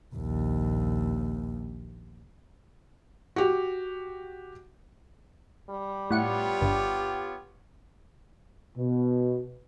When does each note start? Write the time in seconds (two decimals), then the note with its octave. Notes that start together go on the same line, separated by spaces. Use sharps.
0.15 A#1 D#2
3.36 F#4 G4
5.70 G3
6.11 A2 B3 F4 G4 C#5 F#5 C#7
6.61 G1
8.78 B2